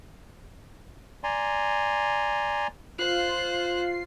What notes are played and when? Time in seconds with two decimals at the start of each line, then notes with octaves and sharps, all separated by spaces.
1.24 D5 G#5 A#5 C6
2.99 F4 C5 F#6 C7